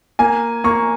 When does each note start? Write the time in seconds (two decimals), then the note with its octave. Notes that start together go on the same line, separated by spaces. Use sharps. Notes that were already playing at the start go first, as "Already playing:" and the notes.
0.19 A#3 G#5
0.64 A#3 C#6